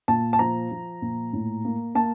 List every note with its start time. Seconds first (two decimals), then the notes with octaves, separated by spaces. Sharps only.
0.08 A#2 A5
0.33 A5
0.39 F3 A#5
0.71 F3
1.02 A#2
1.33 A2
1.65 A#3
1.95 A#3 A5